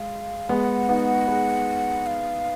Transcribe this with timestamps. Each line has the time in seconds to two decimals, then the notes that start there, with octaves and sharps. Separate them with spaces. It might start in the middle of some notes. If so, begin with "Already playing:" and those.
Already playing: G#3 F5
0.49 G#3 B3 F#5
0.88 B3 D#4
1.27 G#4 B4
2.06 F5